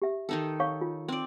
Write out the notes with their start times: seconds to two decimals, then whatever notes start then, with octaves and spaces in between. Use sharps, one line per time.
0.02 G4 E5
0.29 D#3 D#4 A4
0.60 C#5 F5 C#6
0.81 F4
1.08 C4 D5